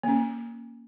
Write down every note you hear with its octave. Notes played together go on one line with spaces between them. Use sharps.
A#3 C#4